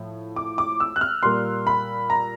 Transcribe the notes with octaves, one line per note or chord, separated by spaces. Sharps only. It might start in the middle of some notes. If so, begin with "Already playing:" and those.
Already playing: A2 F3
D6
D6
E6
F#6
F6
A#2 G3 A#3 C6
B5
A#5